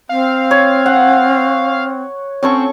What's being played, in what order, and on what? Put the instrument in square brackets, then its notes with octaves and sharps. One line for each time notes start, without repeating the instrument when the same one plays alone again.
[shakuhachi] C4 [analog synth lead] F5
[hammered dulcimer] C#5
F#5
[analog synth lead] C4 [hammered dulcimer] C#4 A4 C#6